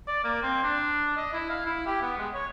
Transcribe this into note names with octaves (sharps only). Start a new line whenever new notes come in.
D5
A#3
C4
D4
D#5
E4
F5
E4
G4
B3
G#3
C#5